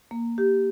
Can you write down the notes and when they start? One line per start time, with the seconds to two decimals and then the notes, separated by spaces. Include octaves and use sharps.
0.11 A#3
0.38 G4